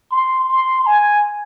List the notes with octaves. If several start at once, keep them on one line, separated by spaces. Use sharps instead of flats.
C6
C6
G#5